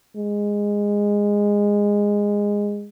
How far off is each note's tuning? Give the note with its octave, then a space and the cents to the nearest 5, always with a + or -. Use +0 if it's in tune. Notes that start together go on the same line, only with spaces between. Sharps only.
G#3 -15